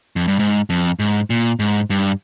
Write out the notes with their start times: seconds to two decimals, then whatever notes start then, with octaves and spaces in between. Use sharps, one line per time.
0.16 F2
0.28 G2
0.39 G#2
0.70 F2
0.99 G#2
1.30 A#2
1.59 G#2
1.90 G2